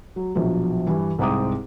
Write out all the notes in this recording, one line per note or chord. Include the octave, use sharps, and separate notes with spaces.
F#3
A#1 B2 F3 F#3
G2 E3
C2 G#2 C4 D6 D#6